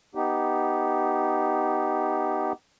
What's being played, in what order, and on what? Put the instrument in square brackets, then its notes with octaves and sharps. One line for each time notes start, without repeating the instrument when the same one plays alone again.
[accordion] B3 D#4 G4